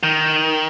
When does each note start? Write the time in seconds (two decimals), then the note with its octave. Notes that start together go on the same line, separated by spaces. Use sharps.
0.03 D#3